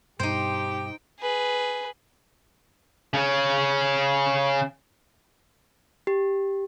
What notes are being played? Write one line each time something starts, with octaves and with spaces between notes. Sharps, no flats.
G2 B2 D#4 G4 C5 G5
G#4 B4
C#3 C#4
G4